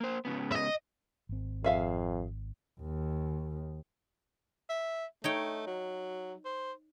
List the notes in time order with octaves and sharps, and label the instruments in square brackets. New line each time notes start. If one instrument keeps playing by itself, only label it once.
[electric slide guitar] A#3 C5
G#2 C#3 B3
[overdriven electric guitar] D#5 E5
[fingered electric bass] G#1 C4
[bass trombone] F2 [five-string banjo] G#4 E5 F5
[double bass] D#2
[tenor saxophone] E5
[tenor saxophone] A3 [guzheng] D#4 C#5 G5
[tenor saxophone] F#3
C5